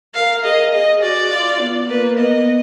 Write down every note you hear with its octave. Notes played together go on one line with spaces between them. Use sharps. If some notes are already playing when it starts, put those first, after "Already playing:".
A#4 F5
G#4 D#5
G#4 D#5
F#4 D5
F4
B3
A#3 B4
B3 D#5